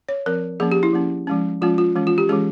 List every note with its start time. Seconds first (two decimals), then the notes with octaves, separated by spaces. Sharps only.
0.09 C#5
0.26 F3 C4 A#4
0.60 F3 A#3 C#4 G#4
0.72 G4
0.83 E4
0.93 F3 A#3 C#4
1.27 F3 G#3 C#4
1.62 F3 G#3 C#4 F4
1.78 F4
1.96 E3 G#3 C#4
2.07 F4
2.18 G4
2.29 E3 G#3 C#4 G#4